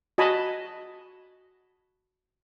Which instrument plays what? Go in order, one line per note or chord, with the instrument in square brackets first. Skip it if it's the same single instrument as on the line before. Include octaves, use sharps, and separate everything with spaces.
[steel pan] F#4 D#5 G#5 A5 B5